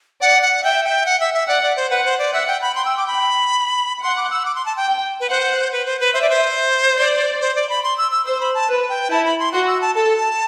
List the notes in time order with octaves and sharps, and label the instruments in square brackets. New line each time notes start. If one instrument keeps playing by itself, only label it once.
[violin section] D5 [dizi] F#5
[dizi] F#5
[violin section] E5 [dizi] G5
[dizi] G5
F#5
E5
E5
[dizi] D5 [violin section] F#5
[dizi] D5
C5
[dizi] B4 [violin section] F#5
[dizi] C5
D5
[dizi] E5 [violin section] F#5
[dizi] G5
B5
[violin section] G5 [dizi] C6
[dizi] E6
D6
B5
[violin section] F#5 [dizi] C6
[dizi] D6
E6
D6
C6
A5
G5
[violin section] G5
[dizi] B4
[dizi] C5 [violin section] F#5
[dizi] B4
C5
B4
[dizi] C5 [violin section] E5
[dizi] D5
C5
[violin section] D5
[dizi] C5
D5
B5
C6
E6
E6
[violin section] C5 [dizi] E6
[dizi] B5
A5
[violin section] B4
[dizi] G5
[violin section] E4 [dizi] A5
[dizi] B5
C6
[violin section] F#4 [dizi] C6
[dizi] E6
A5
[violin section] A4 [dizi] A5